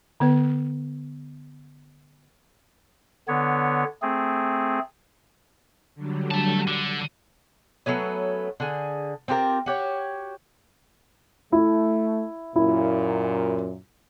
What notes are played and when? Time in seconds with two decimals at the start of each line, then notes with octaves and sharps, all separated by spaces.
0.20 D3 B3 B4
3.28 D3 B3 C#5
4.02 A3 C4 G#4
5.95 D3 F#3 G3
6.31 A3 A5
6.67 D3
7.86 F#3 A3 B3 C#4
8.60 D3 G#4
9.28 C4 F4 G4 A#4
9.66 F#4 G4 C#5
11.52 A3 E4
12.56 F#2 A#2 E4